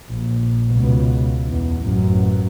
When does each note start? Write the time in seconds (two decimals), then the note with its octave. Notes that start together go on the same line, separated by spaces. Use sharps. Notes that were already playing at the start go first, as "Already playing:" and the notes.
0.10 A#1
0.73 C#2 B2
1.47 E2
1.83 A1 F#2